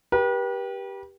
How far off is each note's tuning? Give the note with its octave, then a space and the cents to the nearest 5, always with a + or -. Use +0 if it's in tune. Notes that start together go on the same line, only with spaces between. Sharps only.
G4 +0 B4 -40